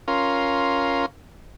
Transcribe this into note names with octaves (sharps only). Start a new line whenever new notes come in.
C#4 F4 A#4 F5 C6